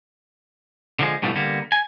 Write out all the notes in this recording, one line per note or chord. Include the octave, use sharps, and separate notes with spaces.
D3 F3 G#3
G2 B2 D3 E3 F3 A3
D3 G3 A#3 B3
G#5